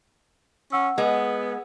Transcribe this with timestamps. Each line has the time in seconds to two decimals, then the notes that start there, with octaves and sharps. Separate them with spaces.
0.72 C#4 F#5 E6
0.98 G#3 B3